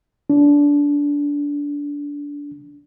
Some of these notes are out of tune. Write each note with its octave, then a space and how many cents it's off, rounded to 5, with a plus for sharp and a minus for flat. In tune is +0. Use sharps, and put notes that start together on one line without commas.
D4 -20